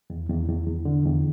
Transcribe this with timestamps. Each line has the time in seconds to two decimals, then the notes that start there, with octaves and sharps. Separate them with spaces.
0.10 E2
0.29 E2
0.49 E2
0.67 E2
0.85 D3
1.05 E2